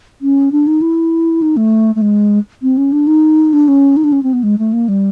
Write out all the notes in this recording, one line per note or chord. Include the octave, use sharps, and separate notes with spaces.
C#4
D4
D#4
E4
D#4
A3
A3
G#3
C4
C#4
D4
D#4
D4
C#4
D#4
D4
C#4
C4
B3
G#3
A3
A#3
G3